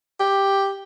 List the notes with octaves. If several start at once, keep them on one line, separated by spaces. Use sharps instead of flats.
G4